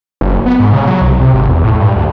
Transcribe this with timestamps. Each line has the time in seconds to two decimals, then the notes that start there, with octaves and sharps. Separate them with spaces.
0.21 F#1
0.46 B3
0.59 G#2
0.73 C#3
0.87 F#3
1.02 C2
1.20 C3
1.34 G#1
1.49 E2
1.64 A2
1.80 G2
1.96 D2